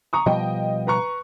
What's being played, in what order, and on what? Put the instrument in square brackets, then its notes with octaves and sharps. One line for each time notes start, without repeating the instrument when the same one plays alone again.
[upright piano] A#5 C#6 D#6
[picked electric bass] B2 F3 G3 [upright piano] D#5 G5
[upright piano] B4 A#5 C#6